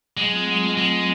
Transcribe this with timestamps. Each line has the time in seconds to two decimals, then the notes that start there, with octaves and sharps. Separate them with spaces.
0.17 F#3 G#3
0.32 A3 C4 F4
0.47 F#3
0.62 A3 C4 F4
0.77 F#3 G#3
0.93 A3 C4 F4